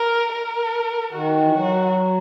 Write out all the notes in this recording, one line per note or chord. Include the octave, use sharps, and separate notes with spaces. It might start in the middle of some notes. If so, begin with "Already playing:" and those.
Already playing: A#4
A#4
D#3 F#4
E3
F#3 F#4